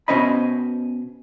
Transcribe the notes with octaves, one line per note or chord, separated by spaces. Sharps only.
B2 A#3 C#4 C5 D#5 B5